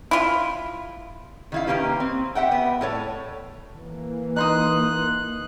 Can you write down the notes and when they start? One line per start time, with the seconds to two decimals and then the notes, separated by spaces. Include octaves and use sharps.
0.11 E4 F4
1.52 D#3 E4 F5
1.67 D#3 F3 A#3 C#4 G4 B4
2.00 C4
2.35 G4 E5 F#5 G5
2.52 B3
2.81 A2 A4 C#5
3.77 E3 A#3
4.36 D#4 C6 D#6 F#6